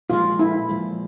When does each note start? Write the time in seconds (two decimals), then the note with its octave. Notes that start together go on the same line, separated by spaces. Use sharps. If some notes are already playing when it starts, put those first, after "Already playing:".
0.10 A#2 F3 G#3 F4
0.39 E4
0.69 A#2 F3 G#3